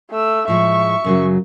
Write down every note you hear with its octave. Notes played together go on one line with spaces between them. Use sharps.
A3 E6
A2 F3 G#3 E5 C#6
F#2 C#3 F#3